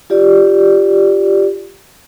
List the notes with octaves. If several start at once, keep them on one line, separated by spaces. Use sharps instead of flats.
F4 G4 D5